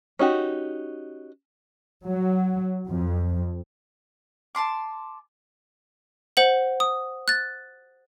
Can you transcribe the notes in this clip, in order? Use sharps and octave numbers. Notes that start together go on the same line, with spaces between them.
C#4 D#4 F#4 G4
F#3
F2
A5 A#5 C6 D6
C5 F#5 F#7
D#6
F#6 A6